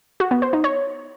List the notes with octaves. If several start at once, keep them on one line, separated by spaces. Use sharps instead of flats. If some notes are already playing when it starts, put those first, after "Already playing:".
F#4
B3
C5
D#4
C#5